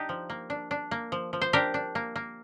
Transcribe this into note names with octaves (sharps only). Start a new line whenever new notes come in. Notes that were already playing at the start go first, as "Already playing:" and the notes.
Already playing: D4 D#4 G4
F3
A#3
D4
D4
A#3
F3
F3
C5
D4 G4 A#4
D4
A#3
A#3